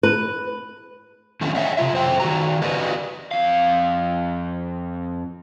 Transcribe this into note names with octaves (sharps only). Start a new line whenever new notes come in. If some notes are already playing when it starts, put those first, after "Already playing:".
B4
D3 D#3 F#3 A3 C4 C#4
C#5 D#5 E5 F#5
C3 G#3 F4 E5
F#2 C5 G5
D#3 F#4 A#5
F#4 G4 A#4 B4 D5 D#5
F2 F5